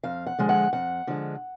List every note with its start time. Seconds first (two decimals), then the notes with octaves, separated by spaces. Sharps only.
0.03 F2 F5
0.26 F#5
0.39 D3 F3 G#3
0.49 F#5
0.73 F2 F#5
1.07 D3 F3 G#3